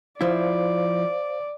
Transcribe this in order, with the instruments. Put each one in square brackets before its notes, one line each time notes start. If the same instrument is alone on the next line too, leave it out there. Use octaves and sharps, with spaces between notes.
[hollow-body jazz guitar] F3 E4 [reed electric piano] C5 F5 [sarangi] D5